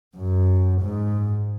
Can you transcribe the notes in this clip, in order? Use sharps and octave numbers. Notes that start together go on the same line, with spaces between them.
F#2
G#2